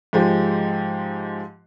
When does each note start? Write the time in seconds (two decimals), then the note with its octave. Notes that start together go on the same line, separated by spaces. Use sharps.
0.13 G#2 F3 G#3 G4